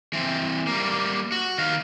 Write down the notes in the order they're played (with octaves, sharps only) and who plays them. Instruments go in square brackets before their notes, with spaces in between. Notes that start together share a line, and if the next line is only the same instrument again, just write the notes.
[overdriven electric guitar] E3 C4
G3 A#3
F#4
D#3 F5